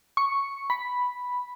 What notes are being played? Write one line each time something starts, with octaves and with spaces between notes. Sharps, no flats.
C#6
B5